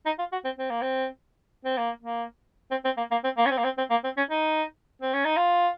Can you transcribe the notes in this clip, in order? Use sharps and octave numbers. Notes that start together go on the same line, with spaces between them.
D#4
F4
F#4
C4
C4
A#3
C4
C4
A#3
A#3
C4
C4
A#3
A#3
C4
A#3
C#4
C4
A#3
C4
C4
A#3
C4
C#4
D#4
C4
C#4
D#4
F4